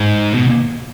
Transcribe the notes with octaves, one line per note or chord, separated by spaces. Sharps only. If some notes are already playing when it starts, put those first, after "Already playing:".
Already playing: G#2
B2